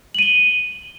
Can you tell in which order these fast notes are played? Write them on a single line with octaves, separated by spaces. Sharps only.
F#7 D#7 G7